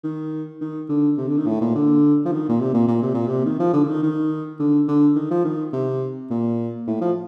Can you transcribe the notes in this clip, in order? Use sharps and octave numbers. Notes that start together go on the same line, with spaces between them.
D#3
D#3
D3
C3
D3
D#3
A2
A#2
D3
F3
D#3
A#2
C3
A#2
A#2
C3
A#2
C3
D#3
F3
D3
D3
D#3
D#3
D3
D3
D#3
F3
D#3
C3
A#2
A2
F3